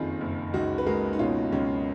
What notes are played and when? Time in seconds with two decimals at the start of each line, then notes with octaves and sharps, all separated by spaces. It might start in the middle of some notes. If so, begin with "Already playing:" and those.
Already playing: F#1 F2 D#3 F4 G#4
0.21 F#1
0.54 C#2 D#4 F#4
0.78 B4
0.86 G#3 F#4 A#4
1.13 D#4
1.19 B2 C#4 F4
1.52 C#2 C#4